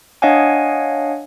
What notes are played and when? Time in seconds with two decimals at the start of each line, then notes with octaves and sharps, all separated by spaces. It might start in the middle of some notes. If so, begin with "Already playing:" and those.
0.22 D4 C#5 D#5 F5 F#5 G#5